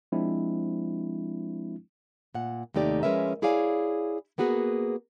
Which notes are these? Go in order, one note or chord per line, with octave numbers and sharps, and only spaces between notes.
F3 G#3 C4 D4 E4
A#2 F#5
D#2 C3 A3 D#4 G4 D5
F3 G#3 C#4 A#4 B4 E5
E4 G#4 C#5 D5 F5 G#5
A#3 B3 F#4 G#4 B4